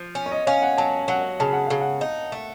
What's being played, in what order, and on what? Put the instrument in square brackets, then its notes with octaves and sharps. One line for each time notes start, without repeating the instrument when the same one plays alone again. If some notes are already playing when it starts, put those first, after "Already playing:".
Already playing: [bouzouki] F3
C#4
[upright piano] C#5
D#5
[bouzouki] C#4 [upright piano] F5
[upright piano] F#5
[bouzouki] F#3 [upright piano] A5
[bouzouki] F#3 [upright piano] F#5
[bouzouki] C#3 [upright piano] A5
[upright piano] F#5
[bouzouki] C#3 [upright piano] F5
[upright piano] F#5
[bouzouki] D#4
A3